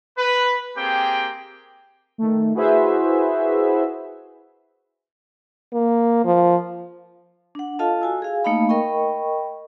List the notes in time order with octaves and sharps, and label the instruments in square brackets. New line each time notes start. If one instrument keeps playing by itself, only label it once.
[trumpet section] B4
A#3 C4 G4 G#4 G5
[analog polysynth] D#3 A3
E4 F#4 G#4 B4 C5 E5
[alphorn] A#3
F3
[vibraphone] D4 F#5
F4 A4 D#5 F5 A5
F#4 G#5 E6
G#4 F5 G#5
A3 A#3 D#4 D#5 F5 B5
A#4 D#5 G5 B5 C#6